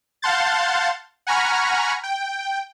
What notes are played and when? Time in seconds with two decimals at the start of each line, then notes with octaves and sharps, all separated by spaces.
0.22 F5 F#5 A5 C6 G6 A6
1.27 F#5 G#5 A#5 B5 C#6 F6
2.03 G5